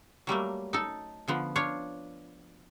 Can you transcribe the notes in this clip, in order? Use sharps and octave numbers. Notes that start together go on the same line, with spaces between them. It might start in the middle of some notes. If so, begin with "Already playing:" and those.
F#3 G3 A3 A#3
D#4 A4
D3 F3 B3
D4 F4 C#5 F5